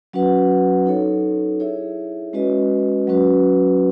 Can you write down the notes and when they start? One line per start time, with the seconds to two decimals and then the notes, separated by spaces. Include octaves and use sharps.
0.13 F#3 C#4 F#4 B4 F#5
0.86 D#4 A4 C#5
1.60 E4 G#4 C#5 E5
2.33 G#3 C#4 F#4 B4 D#5
3.08 F#3 C#4 F#4 B4